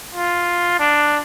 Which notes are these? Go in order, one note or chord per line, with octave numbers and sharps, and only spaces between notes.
F4
D4